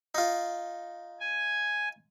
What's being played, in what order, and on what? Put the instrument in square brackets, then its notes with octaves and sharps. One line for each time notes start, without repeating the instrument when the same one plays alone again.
[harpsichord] D#4 F4
[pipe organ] G#5